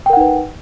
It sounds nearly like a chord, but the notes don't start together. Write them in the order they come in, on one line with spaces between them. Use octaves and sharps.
G5 A#4 F#5 D#4 B4